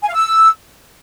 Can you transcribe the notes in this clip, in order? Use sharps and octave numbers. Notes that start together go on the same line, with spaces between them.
G#5
F5
E6